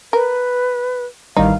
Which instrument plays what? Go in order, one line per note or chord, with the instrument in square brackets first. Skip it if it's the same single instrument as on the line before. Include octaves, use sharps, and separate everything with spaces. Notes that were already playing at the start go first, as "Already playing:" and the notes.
[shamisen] A#4 [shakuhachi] B4
[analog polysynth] A1 D#3 G3 [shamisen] D#4 [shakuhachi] F5